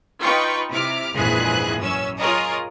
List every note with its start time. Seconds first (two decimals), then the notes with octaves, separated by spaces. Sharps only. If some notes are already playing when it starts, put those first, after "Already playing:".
0.21 D#4 F4 B4 G5 C#6
0.71 C3 E4 D6 F6
1.15 A#1 F2 G#2 E3 G#4 F#6
1.81 F#2 C#4 E6
2.20 F4 G#4 A#4 C#5 D#5